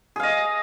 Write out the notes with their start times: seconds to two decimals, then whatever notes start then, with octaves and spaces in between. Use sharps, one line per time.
0.16 G#4
0.20 F5
0.23 D#5